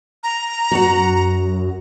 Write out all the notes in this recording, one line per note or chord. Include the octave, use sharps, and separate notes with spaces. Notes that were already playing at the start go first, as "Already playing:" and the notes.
A#5
F#2 F#4 F#5